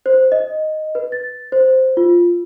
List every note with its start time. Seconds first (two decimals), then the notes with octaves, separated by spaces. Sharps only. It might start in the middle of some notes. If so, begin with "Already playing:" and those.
0.06 C5
0.32 D#5
0.95 B4
1.12 A6
1.52 C5
1.97 F4